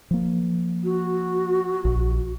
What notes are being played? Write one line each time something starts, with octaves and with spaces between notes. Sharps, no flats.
F3 A#3
F#4
A#1